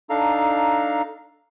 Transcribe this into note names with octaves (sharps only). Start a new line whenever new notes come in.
D4 D#4 A4 F5 A#5